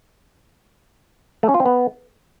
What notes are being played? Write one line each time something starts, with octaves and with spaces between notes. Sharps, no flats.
A3
C#4
F4
C4
B3